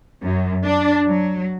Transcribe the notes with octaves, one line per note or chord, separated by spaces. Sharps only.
F#2
D4
F#3